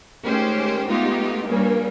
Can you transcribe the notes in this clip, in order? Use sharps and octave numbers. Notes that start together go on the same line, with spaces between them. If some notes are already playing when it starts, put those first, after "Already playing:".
D#3 G#3 A3 C#4 G4 C5
G#3 A3 B3 D#4 F4 G4
G2 A#2 C#3 G3 A#3